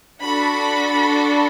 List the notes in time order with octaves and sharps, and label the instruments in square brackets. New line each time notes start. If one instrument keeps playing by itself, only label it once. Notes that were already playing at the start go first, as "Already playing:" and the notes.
[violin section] D4 F#4 A4 B5